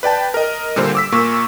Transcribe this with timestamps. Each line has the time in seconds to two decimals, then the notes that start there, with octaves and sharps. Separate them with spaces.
0.03 B4 D5 G5 A5
0.34 A#4 D#5
0.76 A#2 D3 G3 A#3 C5
0.95 D6 E6 B6
1.12 A#2 A#3 C#6